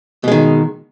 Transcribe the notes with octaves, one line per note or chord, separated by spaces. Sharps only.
B2 D#3 G#3